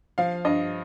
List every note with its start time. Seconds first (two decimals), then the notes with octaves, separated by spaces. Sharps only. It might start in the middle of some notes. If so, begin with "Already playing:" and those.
0.18 F3 F5
0.45 G2 D#5